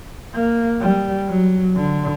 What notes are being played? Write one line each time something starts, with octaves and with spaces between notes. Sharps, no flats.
A#3
G3
F#3
D3